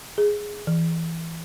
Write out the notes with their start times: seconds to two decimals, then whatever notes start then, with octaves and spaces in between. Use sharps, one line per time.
0.18 G#4
0.67 E3